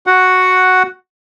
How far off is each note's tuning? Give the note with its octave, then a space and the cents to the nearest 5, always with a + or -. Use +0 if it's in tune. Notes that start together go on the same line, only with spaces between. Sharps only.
F#4 +0 F#5 +0